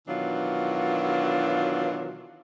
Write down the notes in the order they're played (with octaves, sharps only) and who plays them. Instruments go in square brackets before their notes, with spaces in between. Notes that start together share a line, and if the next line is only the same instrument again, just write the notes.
[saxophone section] B2 D#3 E3 F#3 D4 F4